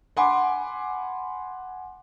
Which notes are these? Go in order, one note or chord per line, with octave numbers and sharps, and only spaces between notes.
F#5 G#5 B5 C6 D6